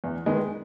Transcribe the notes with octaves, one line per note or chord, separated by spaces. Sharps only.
E2
D#3 G#3 B3